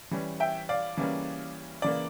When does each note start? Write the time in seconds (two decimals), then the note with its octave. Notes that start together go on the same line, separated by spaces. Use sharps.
0.11 E3 G3 C#4
0.40 E5 G5
0.69 D5 F5
0.97 C#3 E3 G3 A#3 C#4
1.82 C#3 E3 A#3 D5